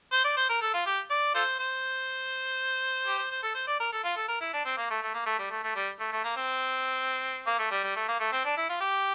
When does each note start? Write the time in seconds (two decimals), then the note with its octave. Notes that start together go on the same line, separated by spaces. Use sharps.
0.12 C5
0.25 D5
0.37 C5
0.49 A#4
0.62 A4
0.74 F4
0.86 G4
1.10 D5
1.35 F4 A4 C5
1.60 C5
3.07 G4
3.19 C5
3.31 C5
3.43 A4
3.55 C5
3.67 D5
3.80 A#4
3.92 A4
4.04 F4
4.17 A4
4.29 A#4
4.41 E4
4.54 D4
4.65 C4
4.77 A#3
4.90 A3
5.02 A3
5.14 A#3
5.26 A3
5.39 G3
5.50 A3
5.63 A3
5.76 G3
6.00 A3
6.12 A3
6.24 A#3
6.36 C4
7.47 A#3
7.59 A3
7.71 G3
7.84 G3
7.96 A3
8.08 A#3
8.20 A3
8.33 C4
8.45 D4
8.57 E4
8.69 F4
8.81 G4